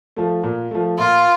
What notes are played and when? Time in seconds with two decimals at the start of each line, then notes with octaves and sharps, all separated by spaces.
0.16 F3 A3
0.43 A#2
0.71 F3 A3
0.99 A#2 F4